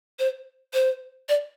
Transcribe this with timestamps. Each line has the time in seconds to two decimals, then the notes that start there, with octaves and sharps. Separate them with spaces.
0.19 C5
0.74 C5
1.29 D5